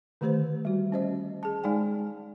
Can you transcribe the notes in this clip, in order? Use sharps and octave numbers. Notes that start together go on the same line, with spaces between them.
D3 D#3 A3 G4 B4 C5
G3 F#4
C#4 C5 D#5
G#4 A5
G#3 D#4 G#4 D5 G5 G#5